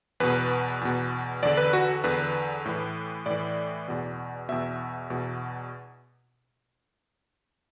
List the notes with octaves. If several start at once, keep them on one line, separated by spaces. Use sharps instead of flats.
E2 B2 B4
E2 B2
E2 D3 D5
B4
F#4
E2 D3 B4
A2 E3
A2 E3 D5
E2 B2
E2 B2 E5
E2 B2